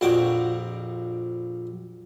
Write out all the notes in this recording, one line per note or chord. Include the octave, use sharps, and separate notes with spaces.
A#1 F2 D4 F#4 G5 D6